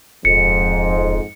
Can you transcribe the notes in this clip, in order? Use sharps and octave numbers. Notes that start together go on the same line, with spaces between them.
D#1 F2 G#2 C#7